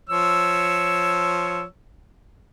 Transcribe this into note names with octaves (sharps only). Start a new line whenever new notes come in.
F3 C#5 E6